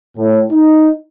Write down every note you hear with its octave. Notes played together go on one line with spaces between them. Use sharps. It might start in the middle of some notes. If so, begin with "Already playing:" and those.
A2
D#4